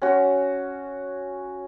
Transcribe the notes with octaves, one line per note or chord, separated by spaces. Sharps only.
C#4 F#4